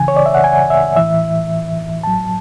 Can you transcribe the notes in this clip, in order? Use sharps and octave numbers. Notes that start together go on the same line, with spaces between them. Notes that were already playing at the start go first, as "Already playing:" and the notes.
Already playing: C#3 E3 G#5
C#5
D5
E5
F#5
G#5
E5
A2 E3 E5
A2 F#3 A5